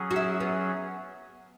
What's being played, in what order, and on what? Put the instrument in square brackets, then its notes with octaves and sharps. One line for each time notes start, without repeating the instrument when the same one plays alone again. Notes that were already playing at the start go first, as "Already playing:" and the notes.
Already playing: [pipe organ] F#3 C#4 G#4
[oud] F#4
E4
B3